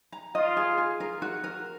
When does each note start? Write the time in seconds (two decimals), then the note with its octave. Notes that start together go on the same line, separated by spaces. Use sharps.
0.12 A#5
0.35 F4 D#5
0.57 G#4
0.78 G#4
1.00 A#4
1.22 F#4
1.44 A#4